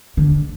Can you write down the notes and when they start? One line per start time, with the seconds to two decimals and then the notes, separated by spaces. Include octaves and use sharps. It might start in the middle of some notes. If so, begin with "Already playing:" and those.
0.17 D3